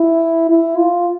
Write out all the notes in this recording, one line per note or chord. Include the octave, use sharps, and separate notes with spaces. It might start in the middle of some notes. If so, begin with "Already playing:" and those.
Already playing: E4
E4
F4